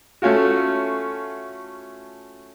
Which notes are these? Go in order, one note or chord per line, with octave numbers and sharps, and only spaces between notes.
A3 C#4 F4 F#4